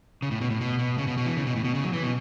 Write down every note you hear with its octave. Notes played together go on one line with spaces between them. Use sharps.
C#3
A2
B2
A2
B2
B2
C#3
B2
B2
E3
C#3
B2
A2
B2
C#3
F#3
E3
B2